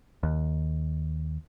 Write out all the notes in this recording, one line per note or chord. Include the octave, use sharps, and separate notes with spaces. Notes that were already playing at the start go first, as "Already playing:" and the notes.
D#2